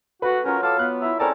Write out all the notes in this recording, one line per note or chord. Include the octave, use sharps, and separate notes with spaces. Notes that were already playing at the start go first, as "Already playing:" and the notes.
A3 F#4 B4
F#3 C#4 F4 A#4
A4 F5 B5 D6
B3 F#6
E4 E5 A#5
G#3 C4 C#4 A4 A#4 D5